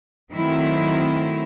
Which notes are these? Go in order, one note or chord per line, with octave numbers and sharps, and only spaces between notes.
D#3 F#3 A3 C4 E4